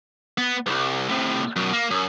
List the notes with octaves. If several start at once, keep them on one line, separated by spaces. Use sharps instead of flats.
B3
C2 G2
A2 C3
F#2 B2
A#3
F#2